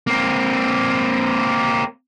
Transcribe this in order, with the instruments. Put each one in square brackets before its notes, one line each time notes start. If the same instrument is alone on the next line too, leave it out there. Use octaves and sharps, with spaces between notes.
[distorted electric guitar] A#3 C4